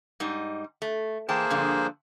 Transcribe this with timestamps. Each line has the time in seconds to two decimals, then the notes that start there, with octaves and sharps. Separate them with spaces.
0.20 G#2 G3 D#4
0.82 A3
1.29 E3 A#3 G#4 C5 G5 A5
1.50 G2 D3 F3